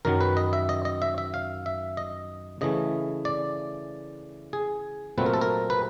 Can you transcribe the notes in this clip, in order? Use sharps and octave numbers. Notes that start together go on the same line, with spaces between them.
F#2 D#3 F#3 A#4
B4
D#5
E5
D#5
D#5
E5
E5
F5
E5
D#5
C#3 E3 A3 D#5
D5
G#4
A#2 F#3 A3 C4 B4
A#4
A4
A#4
B4